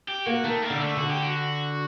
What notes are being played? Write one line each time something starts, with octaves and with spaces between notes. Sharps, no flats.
G4
A#3 F#4
D#3 A3
A#3
D3 G3
A3
D3 F#4
G4
F#4